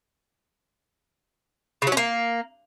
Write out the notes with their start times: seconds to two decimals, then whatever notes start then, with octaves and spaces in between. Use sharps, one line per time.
1.82 C#3
1.87 F#3
1.92 C#4
1.97 A#3